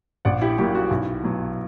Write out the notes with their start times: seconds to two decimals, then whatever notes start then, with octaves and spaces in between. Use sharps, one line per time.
0.25 A#1 D5 F#5
0.42 E4 G4
0.58 A#2 F#3 E4 G4
0.75 F#4
0.91 B1 E4
1.23 B2 F#3